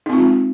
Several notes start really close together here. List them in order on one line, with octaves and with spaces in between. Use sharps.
D#4 C4 F4 G#3